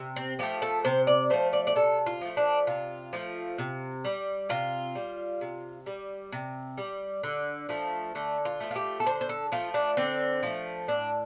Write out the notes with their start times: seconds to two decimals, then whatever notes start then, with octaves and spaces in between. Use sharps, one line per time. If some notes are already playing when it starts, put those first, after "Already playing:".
Already playing: C3
0.16 C4
0.39 F3 A3 G4
0.62 A4
0.85 C3 C5
1.07 D5
1.30 F3 A3 C5
1.53 D5
1.67 D5
1.75 C3 A4
2.06 F4
2.21 F3 A3
2.37 D4
2.67 C3 F4
3.13 F3 A3
3.58 C3
4.05 G3
4.49 C3 F4
4.95 G3
5.41 C3
5.86 G3
6.32 C3
6.78 G3
7.23 D3
7.69 F3 A3
8.15 D3 A3
8.45 F4
8.60 F3 A3
8.71 F4
8.76 G4
9.00 A4
9.06 D3 C5
9.21 C5
9.29 A4
9.52 F3 A3 F4
9.74 D4
9.97 D3 C4
10.43 F3 A3
10.88 A2 D4